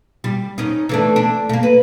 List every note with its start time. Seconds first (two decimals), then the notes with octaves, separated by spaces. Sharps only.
0.24 G3
0.58 C#4 D#4
0.89 E3 A3 D4
1.16 D4
1.49 A3 A#3
1.63 B4